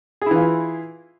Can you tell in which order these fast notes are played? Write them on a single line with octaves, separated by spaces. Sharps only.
G#4 E4 E3 F4